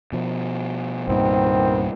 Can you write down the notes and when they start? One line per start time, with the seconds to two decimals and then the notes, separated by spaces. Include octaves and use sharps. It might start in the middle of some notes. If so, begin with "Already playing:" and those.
0.12 B2 F3
1.08 C2 G2 A#2 D#3 B3 C4